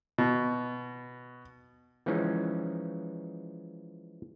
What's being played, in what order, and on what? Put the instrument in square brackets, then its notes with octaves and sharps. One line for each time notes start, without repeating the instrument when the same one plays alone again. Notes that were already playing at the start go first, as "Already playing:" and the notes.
[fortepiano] B2
[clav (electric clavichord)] E3 F3 G#3 C#4 D#4